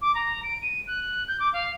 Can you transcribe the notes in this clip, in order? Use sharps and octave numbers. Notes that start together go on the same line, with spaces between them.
D6
A#5
D7
D#7
F#6
G6
D6
F5